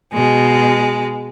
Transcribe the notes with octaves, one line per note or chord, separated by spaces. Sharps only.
B2 G#3